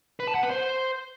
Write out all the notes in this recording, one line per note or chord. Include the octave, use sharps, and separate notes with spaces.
B4
A5
F#5
B4
C5